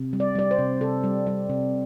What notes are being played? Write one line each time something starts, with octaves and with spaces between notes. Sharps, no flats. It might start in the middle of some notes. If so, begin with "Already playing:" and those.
Already playing: C3
G3
D5
G3 D5
C5
C3
C3 A4
G3
G3
C3